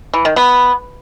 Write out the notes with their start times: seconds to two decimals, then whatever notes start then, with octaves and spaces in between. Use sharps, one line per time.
0.13 E3
0.25 D#3
0.36 B3